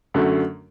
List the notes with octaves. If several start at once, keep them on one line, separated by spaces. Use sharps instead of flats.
F#2 D3 F#3 A3